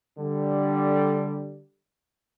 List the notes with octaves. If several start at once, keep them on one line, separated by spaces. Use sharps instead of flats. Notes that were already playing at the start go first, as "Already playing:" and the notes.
D3 G3